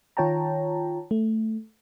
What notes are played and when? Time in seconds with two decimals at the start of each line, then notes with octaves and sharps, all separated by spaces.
0.17 D#3 F4 C#5 G5 A5 A#5
1.11 A3